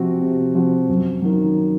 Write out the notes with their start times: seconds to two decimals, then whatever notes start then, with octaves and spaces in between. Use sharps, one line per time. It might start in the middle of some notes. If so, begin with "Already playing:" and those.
Already playing: C3 F3 C4 F#4
0.21 C3
0.55 F3 C4 F#4
0.89 F#2
1.22 D#3 F#3